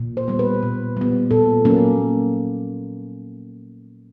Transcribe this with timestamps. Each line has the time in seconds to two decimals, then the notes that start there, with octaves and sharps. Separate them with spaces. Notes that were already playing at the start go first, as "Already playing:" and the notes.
Already playing: A#2
0.17 C5
0.28 G3 B3
0.39 B4
0.63 A#2
0.97 G3 B3
1.31 A#2 A4
1.65 F#3 A#3 C#4